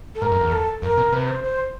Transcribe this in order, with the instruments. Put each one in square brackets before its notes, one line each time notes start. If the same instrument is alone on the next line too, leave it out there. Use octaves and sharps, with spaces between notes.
[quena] A4
[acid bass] G#2 [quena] A#4
[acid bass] F#2
E2
[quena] A4
[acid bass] F2 [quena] A#4
[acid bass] B2
[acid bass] C3 [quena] B4
[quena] C5
C5